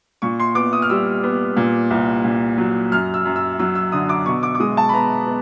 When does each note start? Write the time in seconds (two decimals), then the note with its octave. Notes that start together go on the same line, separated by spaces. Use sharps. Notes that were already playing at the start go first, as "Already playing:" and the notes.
0.22 A#2 C#6
0.40 C6
0.55 B3 D6
0.73 D#6
0.82 F6
0.90 G3 E6
1.23 B3
1.57 A#2
1.90 C2
2.24 A#2
2.58 F#3
2.92 F#2 F6
3.14 E6
3.25 F#2
3.36 E6
3.59 F#3 E6
3.75 E6
3.92 D3 D#6
4.09 D6
4.26 B2 C#6
4.43 D6
4.55 D6
4.60 G#3 D#6
4.77 A5
4.89 B5
4.93 B3 A#5
5.27 B3